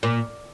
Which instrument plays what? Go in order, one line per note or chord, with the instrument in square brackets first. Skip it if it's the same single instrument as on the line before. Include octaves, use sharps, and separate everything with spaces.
[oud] A#2